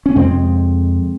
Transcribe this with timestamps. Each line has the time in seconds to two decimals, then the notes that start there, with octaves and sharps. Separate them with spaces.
0.06 C#4
0.16 F2 C3 G#3 C4